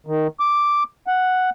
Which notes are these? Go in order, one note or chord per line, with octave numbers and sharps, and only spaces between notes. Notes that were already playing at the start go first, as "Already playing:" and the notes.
D#3
D6
F#5